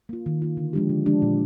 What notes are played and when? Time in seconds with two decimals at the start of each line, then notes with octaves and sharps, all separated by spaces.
0.09 A#3 F4
0.26 D#3
0.42 A#3 F4
0.57 D3
0.73 F3 G#3 D4 G4
0.89 D3
1.06 F3 G#3 D4 G4
1.22 A#2